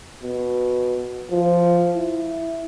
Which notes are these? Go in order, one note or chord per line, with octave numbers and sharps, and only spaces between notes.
B2
F3
E4